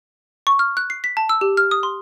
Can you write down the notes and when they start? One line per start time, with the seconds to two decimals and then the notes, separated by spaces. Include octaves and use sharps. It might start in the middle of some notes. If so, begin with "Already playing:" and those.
0.47 C#6
0.59 F6
0.77 F#6
0.90 C7
1.04 B6
1.17 A5
1.29 E6
1.41 G4
1.57 F6
1.71 D#6
1.83 C6